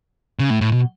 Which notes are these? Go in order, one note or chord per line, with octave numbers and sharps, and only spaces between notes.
C#3
A2
A2
B2